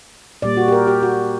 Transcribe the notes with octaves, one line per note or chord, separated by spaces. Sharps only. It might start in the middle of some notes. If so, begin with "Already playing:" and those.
A#2 G3 A#3 D5
F#4
G4
A#4
G4
F#4